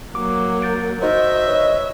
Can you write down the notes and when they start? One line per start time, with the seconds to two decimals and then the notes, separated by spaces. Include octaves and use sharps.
0.15 F#3 A#3 D6
0.62 G6 A6 D7
1.02 D#4 F#4 C5 D#5 E5
1.47 B4 C#5